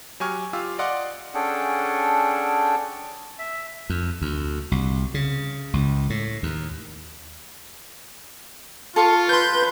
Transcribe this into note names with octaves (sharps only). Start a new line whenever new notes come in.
F#3 G4 G#5 C#6 F6
F4 G4 F5 D6 E6
D5 D#5 F5 F#5 C6 D6
C#4 D4 G#4 A4 F#5 G5
E5
F2
D2
C2
C#3
C#2
A2
D#2
F4 A4 C#5 C#6
B4 C6 G6